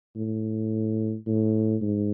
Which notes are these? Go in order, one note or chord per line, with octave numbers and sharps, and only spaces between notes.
A2
A2
G#2